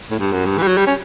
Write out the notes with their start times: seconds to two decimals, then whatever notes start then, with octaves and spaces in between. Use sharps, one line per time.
0.11 A2
0.19 G2
0.32 F#2
0.46 G2
0.58 E3
0.62 G3
0.68 F#3
0.77 G3
0.87 C#4